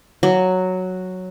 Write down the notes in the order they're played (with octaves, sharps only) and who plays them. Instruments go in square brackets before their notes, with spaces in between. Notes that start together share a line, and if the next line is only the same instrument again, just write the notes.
[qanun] F#3